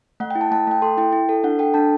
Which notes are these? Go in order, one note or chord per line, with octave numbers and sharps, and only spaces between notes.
A3 F#5
G5
E4
A5
A3 A5
A3 G5
A4 C6
E4 G5
E4
A4
D4 F#5
A4 G5
D4 A5